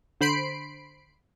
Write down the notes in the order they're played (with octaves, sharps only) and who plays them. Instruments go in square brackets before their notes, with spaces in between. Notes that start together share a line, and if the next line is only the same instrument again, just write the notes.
[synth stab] D3 C5 B5 C7 D7